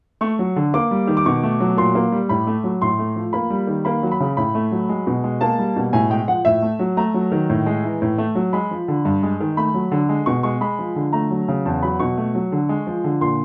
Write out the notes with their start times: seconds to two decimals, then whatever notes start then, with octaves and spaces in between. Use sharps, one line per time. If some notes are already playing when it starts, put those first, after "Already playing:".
0.21 A3 C#6
0.39 F#3
0.56 D3
0.74 A#3 D6
0.91 G3
1.07 D#3
1.17 D6
1.26 B2 C#6
1.43 A3
1.60 F#3
1.77 A#2 C6
1.95 A#3
2.12 G3
2.29 A2 B5
2.47 A3
2.64 F#3
2.82 A2 C6
2.99 A3
3.16 F3
3.33 A#3 B5
3.50 G3
3.67 D#3
3.85 A#3 B5
4.03 F#3
4.12 B5
4.20 C#3
4.37 A2 B5
4.55 A3
4.72 F#3
4.89 G#3
5.07 B2
5.24 G#3
5.41 A#3 A5
5.58 G3
5.76 B2
5.93 A2 G#5
6.10 G#3 G5
6.28 F3 F#5
6.45 A2 E5
6.62 A3
6.79 F#3
6.97 A3 A#5
7.14 F#3
7.32 D#3
7.50 A2
7.66 G#3
7.84 E3
8.02 A2
8.18 A3
8.35 F#3
8.53 G#3 B5
8.71 F3
8.88 D3
9.05 G2
9.23 G#3
9.40 D#3
9.57 A3 B5
9.74 F#3
9.92 D3
10.09 G#3
10.26 B2 C#6
10.43 G#3 C#6
10.61 G#3 B5
10.79 F3
10.96 D3
11.13 A3 A#5
11.31 F#3
11.48 C#3
11.65 E2 A5
11.83 F#3 B5
12.00 B2 C#6
12.17 A3
12.35 F#3
12.52 D3
12.69 G#3
12.87 F3
13.04 D3
13.21 A#2 C6